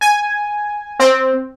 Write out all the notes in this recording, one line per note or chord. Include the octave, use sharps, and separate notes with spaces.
G#5
C4